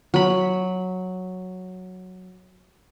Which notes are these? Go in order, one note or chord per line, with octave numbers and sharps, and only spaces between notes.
F#3 B5